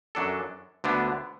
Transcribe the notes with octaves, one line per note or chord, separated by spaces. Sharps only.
F#2 F#3 D4 A4
D2 D3 B3 D4